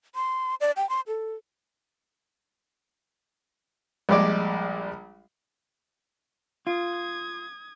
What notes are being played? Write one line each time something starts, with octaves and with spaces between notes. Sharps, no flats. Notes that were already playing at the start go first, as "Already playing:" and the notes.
C6
D5
G5
C6
A4
A#1 G3 G#3 D5 D6
F4 D#6 G#6